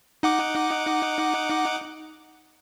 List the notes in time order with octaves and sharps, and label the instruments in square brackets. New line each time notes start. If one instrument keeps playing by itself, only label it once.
[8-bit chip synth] D#4 F#5 D6